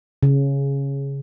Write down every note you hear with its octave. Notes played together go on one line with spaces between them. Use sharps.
C#3